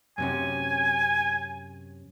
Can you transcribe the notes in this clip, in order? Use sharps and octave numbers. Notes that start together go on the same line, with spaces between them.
F#2 C3 C#4 G#5